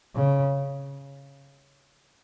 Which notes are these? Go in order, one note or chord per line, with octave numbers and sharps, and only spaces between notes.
C#3